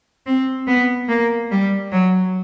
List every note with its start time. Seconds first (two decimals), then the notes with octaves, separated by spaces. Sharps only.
0.26 C4
0.67 B3
1.09 A#3
1.51 G3
1.92 F#3